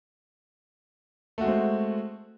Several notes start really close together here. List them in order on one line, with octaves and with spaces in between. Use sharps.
A3 F#4 G#3 C4